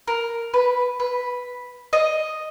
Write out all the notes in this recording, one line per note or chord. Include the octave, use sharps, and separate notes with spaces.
A#4
B4
B4
D#5